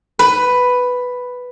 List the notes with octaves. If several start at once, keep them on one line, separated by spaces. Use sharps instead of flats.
B4